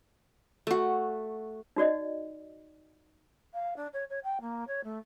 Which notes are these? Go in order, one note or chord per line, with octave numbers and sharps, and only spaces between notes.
A3 F#4
D#4 F#4 D5 D#5
F5
D4
C#5
C#5
G5
A#3
C#5
A3